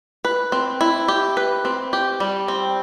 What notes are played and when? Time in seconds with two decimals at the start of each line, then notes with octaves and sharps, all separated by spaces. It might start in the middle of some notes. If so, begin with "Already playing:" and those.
0.25 B4
0.52 C4
0.81 E4
1.08 G4
1.37 B4
1.65 C4
1.93 G4
2.20 G3
2.48 C4